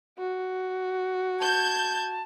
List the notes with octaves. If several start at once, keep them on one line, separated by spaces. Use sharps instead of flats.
F#4
A5 G6 G#6